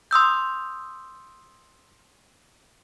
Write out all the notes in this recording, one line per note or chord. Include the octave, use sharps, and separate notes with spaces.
C6 D#6 E6 G6